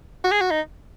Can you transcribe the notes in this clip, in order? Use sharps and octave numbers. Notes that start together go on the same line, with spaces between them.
F#4
G#4
F#4
D#4